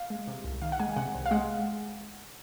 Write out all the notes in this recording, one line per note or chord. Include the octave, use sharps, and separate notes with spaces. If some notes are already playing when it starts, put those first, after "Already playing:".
Already playing: F5
G#3
C3
C2
D#3 F5
F#5
G#3 G#5
C3 F#5
C2
F5
G#3 F#5